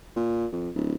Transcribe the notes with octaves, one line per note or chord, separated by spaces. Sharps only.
A#2
F2
D1